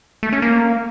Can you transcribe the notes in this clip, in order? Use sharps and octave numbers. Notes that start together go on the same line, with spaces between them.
A3
C#4
A#3